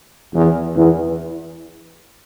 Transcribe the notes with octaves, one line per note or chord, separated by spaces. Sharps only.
E2
E2